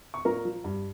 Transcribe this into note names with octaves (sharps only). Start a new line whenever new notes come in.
C#6
A#2 A#4 A#5
F3
G2